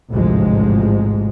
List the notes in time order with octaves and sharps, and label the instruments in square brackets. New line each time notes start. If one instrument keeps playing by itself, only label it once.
[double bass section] A1 D2 G#2 C3 F3 G#3